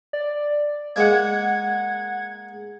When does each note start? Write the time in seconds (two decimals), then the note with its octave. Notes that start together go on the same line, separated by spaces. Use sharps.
0.13 D5
0.96 G#3 A#3 F#5 G#6